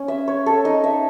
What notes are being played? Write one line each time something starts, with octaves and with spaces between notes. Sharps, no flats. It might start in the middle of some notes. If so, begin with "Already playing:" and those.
Already playing: C#4
E5
C#5
A4
D#4
E5